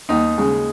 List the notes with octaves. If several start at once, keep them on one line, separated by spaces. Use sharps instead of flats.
D#2 D#4
C#3 G#3